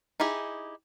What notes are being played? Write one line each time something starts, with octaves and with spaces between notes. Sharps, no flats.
D#4 E4 G4 G#4